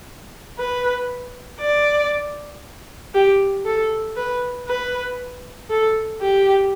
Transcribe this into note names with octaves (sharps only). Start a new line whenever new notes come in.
B4
D5
G4
A4
B4
B4
A4
G4